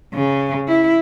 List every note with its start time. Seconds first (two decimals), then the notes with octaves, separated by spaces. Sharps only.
0.14 C#3
0.68 E4